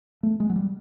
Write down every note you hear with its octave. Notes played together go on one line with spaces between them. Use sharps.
A3
G#3
F#3
G3